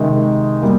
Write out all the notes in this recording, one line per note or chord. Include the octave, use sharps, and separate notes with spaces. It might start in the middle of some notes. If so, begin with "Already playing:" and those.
Already playing: C3 D#3 G#3 D#4
G3 A#3